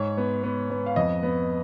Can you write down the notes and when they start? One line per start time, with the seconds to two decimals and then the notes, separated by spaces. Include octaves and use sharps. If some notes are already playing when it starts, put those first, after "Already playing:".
Already playing: G#2 C#5
0.17 B3
0.44 B3
0.70 B3
0.86 F5
0.96 F2 D#5
1.23 B3